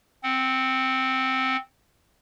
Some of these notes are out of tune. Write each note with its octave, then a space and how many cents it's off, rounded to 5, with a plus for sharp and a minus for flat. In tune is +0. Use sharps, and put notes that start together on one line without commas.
C4 +0 F#5 +0